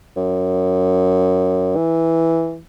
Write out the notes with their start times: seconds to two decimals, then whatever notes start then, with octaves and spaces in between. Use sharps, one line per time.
0.17 F#2
1.76 E3